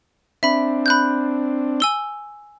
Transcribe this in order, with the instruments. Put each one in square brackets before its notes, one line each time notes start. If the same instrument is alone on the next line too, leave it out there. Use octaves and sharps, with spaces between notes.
[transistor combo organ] C4 D4 [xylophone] E5 B5
[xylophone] B5 F#6 G6
G#5 E6 G7